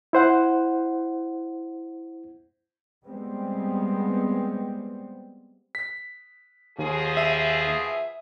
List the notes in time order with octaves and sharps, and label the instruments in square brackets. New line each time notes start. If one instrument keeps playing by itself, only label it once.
[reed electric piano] E4 C5 F#5
[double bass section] G3 G#3 B3 C4
[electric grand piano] B6
[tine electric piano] D#2 [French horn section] B2 F3 G#4
[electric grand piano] E5 D#7